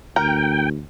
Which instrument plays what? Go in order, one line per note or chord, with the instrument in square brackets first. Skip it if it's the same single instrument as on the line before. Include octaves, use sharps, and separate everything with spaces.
[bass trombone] D2 [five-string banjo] A#4 [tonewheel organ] G5